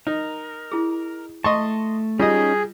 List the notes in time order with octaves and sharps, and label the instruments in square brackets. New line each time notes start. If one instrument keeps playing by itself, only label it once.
[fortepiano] D#4 [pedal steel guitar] A#4
[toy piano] E4 G#4
[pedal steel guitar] A3 A5 [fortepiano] D#5 C6 C#6
[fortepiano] G3 D#5 [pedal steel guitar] C#4 D#4 [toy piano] F4 [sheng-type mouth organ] G#4